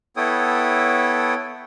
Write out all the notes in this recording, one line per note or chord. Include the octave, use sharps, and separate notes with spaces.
B3 E4 A4 C#5 G5 D#6